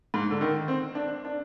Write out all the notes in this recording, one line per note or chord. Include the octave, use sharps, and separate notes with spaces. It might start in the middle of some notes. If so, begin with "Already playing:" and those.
G#2
D3
D#3
C4
D4
D4